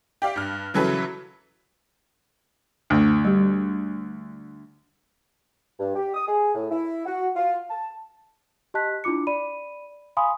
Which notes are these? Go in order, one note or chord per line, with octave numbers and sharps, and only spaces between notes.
G4 D5 F5
G2 F6
C#3 E3 F#3 A4 B4
D2
G3 G4
G2
G4
D#6
G#4
A2
E4
F#4
F4
A5
G4 D#5 A5 F#6 B6
D4 E4 F4 D6 C#7
D5 B5 D#7
F5 G#5 B5 C6 D#6